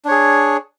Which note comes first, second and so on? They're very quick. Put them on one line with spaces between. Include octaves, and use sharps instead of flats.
D4 C#5 G#4